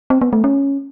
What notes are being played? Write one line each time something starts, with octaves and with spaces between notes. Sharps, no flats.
C4
B3
A3
C#4